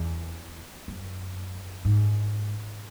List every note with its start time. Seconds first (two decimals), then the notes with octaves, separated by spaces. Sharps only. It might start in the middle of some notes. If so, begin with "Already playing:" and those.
Already playing: E2
0.88 F#2
1.85 G#2